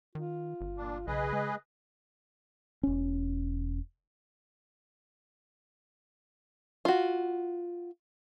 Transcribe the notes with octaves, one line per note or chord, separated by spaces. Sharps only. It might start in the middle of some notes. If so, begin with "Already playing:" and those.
D#3 F4
G1
A#2 D4
B1 C#3 G#4 B4 D#5
G#3
E1 C#4
F4 F#4